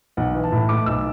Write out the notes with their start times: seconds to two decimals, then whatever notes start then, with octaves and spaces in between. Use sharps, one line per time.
0.17 B1 F#5
0.35 E3
0.44 A5
0.52 A2
0.69 A3 D6
0.86 B1 E6